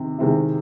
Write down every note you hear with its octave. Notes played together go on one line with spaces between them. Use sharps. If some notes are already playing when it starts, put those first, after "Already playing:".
Already playing: C3 D#3 C4
C3 D#3 G#3 C4 E4